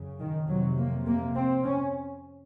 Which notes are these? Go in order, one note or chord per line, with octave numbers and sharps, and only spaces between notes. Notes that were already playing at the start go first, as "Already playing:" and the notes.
Already playing: F#2 C#3
D#3
F2 C3 F#3
A#3
A#3
C4
C#4